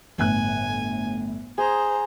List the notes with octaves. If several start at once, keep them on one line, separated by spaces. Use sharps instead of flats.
G1 A2 G#5 F#6
G#4 C5 A#5